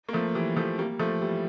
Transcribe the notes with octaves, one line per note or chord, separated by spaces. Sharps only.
A#3
F3 A3
E3 G3
F3 A3
G3 A#3
F3 A3
E3 G3